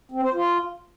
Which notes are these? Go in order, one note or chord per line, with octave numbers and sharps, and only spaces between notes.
C4
C5
F4